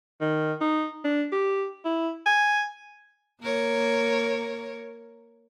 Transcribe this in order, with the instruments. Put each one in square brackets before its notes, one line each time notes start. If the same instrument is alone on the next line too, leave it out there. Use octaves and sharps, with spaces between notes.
[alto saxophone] D#3
D#4
D4
G4
E4
G#5
[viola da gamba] A#3 A#4 C#5